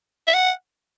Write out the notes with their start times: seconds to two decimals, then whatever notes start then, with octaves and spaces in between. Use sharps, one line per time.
0.27 E5
0.34 F#5